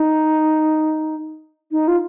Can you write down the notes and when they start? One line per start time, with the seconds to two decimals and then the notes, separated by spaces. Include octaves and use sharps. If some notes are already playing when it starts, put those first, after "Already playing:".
Already playing: D#4
1.72 D#4
1.88 F4